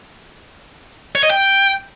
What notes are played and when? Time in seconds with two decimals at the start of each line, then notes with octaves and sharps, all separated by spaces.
1.15 C#5
1.23 D#5
1.30 G5